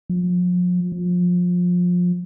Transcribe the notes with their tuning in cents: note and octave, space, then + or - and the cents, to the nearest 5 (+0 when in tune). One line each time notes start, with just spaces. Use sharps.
F3 +40
F3 +25